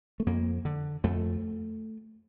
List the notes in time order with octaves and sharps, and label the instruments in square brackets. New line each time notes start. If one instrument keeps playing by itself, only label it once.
[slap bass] A3
F2 A#3
D3
F2 A3